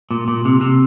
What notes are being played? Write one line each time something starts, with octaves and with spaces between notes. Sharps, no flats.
A#2
A#2
C3
C3